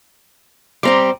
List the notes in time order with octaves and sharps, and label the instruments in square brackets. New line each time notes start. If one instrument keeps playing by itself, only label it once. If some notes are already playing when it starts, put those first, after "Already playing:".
[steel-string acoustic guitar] G3 C4 G4 [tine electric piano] A#5 C6 D6